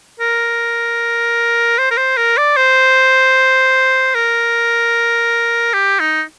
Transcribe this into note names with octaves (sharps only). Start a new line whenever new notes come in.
A#4
C5
A#4
C5
A#4
D5
C5
A#4
G4
D#4